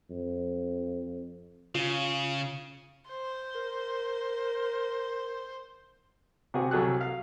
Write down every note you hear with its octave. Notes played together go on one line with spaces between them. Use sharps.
F2
C#3 F4
C5
A#4
C3 F#4 G#4
C2 F#3 G#4 A4 F#6
F5